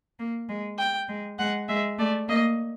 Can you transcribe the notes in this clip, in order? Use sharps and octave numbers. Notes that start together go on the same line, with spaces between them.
A#3
G#3
G5
G#3
G#3 F#5
G#3 E5
A3 D5
A#3 D#5